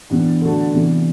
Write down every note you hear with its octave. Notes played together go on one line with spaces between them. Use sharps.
G2 E3 G3 B3
D3 A3 D4 F#4 A4
C3 E3 G3 B3